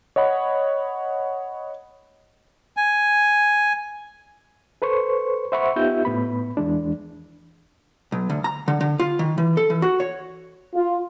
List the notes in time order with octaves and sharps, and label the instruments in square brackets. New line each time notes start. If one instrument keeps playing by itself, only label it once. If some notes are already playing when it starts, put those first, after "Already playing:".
[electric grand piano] C#5 D#5 F#5 B5
[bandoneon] G#5
[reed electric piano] A4 B4 C5 C#6
C5 E5 F#5 B5 C#6
B3 D#4 F4 G4 E5 G6
A2 B3 B5
E2 E3 G#3 D4
[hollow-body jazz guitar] B1
D2
A#5
D3
D3
F4
D#3
E3
A4
E3
F#4
C#5
[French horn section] F4